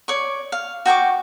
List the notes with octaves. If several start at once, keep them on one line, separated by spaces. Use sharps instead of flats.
C#5 D5 C#6
F5
F#4 G5 C#6 D6